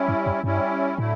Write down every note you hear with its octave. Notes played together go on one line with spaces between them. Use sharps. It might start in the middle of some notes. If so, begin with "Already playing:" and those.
Already playing: G3 C#4 E4
G2
F#2
G2 G3 C#4 E4
A2 D3 F#3 A3 E4